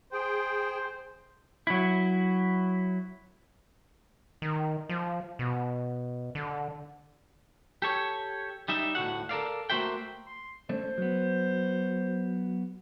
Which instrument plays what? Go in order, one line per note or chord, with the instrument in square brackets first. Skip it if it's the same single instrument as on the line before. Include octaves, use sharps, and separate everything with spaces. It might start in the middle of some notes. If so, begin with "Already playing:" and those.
[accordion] G#4 G5 [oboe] C5
[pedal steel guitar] F#3 E4
[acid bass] D#3
F3
B2
D3
[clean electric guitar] G4 A4 C#5
G3 D#4 E5
D2 A2 F#4 F#5
A4 A#4 D5 F5
A3 A#3 F#4 C5 E5 G5
[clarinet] C6
[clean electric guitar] A3 C#4 D4 [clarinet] C5
[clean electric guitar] F#3 B3